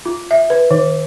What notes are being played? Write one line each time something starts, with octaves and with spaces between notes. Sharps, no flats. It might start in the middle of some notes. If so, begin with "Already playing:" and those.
F4
E5
B4
D#3